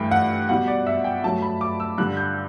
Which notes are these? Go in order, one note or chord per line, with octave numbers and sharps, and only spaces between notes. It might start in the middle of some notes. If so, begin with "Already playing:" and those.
Already playing: G2 E3 A3 G5
F#5
B2 G3 F#5
D5
E5
G5
G2 F#3 A3 A5
B5
D6
E6
G2 D3 G3 F#6
G6